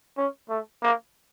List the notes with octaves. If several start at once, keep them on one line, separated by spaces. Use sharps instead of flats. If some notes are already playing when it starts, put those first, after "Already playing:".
C#4
A3
A#3